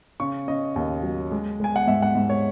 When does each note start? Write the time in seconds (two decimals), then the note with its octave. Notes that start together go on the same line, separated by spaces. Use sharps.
0.20 C#3 C#6
0.48 C#3 D#5
0.76 D#2
1.03 F#3
1.31 G#3
1.60 G#3 G#5
1.76 F#5
1.87 G#2 E5
2.02 F#5
2.15 G#2
2.30 C#5